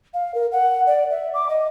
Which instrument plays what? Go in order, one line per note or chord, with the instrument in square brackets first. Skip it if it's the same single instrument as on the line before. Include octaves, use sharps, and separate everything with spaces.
[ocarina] F5
A#4
F#5
D5
E5
D6
D#5